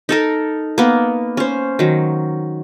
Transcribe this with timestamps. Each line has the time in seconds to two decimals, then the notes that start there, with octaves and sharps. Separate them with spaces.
0.09 D#4 A4 A#4
0.78 A#3 B3
1.37 C#4 C5
1.79 D#3 F#3